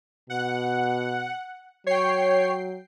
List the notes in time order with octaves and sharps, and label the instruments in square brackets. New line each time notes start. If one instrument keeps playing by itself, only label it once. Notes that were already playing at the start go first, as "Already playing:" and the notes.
[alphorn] B2 [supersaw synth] F#5
[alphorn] F#3 [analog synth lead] C#5 [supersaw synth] G5 C7